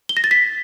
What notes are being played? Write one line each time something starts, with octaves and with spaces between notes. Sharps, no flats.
G7
A#6
A6
B6